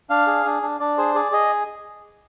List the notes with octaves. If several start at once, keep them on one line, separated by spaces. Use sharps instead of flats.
D4 F5
G#4
D4
D4
D4 D5
G#4 C5
G#4 D5
G#4 D#5